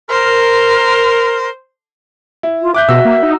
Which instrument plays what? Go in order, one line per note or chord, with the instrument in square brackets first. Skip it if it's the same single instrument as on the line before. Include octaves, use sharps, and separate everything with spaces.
[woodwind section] A#4 [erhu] C5
[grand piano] E4
[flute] F4
[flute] E5 [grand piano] D6 F#6 G6
[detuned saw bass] B2 [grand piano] F#4 E6
[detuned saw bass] A#3
D#4